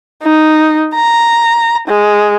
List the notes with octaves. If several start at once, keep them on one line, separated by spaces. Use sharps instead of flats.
D#4
A#5
G#3